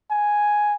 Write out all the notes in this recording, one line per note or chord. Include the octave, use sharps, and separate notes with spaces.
G#5